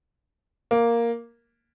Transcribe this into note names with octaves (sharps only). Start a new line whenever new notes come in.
A#3